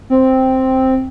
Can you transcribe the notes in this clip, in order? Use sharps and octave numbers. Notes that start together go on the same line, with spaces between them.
C4